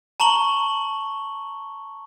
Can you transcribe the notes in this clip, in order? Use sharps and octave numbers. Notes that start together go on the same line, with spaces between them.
A5 A#5 C#6 F#7 G7